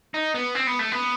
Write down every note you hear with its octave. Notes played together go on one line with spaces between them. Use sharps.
D#4
B3
C4
B3
A3
B3